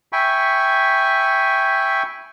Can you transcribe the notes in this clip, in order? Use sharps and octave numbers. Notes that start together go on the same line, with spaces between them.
E5 G5 G#5 B5 C#6